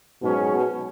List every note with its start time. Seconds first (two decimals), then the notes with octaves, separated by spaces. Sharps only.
0.22 G#2 B2 F#3 C#4 G#4
0.54 B2